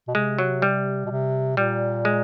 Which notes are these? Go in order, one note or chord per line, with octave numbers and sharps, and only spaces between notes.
B2
C3 G#3
F#3
G3
B2
C3
A#2 G3
G#3